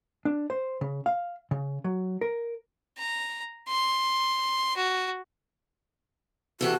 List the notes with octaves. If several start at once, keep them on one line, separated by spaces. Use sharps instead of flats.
D4
C5
C#3
F5
C#3
F#3
A#4
A#5
C6
F#4
C3 E3 F#4 A4